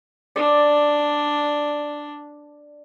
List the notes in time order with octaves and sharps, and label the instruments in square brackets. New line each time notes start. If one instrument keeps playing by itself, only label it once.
[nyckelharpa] D4 [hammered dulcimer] D5